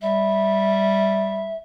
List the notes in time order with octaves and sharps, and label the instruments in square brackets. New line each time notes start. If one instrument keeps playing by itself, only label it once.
[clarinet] G3 [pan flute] E5